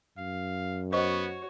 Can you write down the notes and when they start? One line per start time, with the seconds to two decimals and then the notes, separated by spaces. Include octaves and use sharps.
0.18 F#2 F5
0.92 B3 F#4 C5 C#5 D#5 C#6